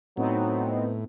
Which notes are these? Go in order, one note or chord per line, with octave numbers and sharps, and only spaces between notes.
A2 F#3 B3 C4 D#4